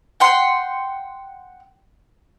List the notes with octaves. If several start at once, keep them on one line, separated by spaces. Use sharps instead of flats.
F#5 G5 C6